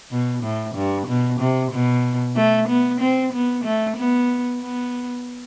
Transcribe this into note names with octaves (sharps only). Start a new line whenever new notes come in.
B2
A2
G2
B2
C3
B2
A3
B3
C4
B3
A3
B3
B3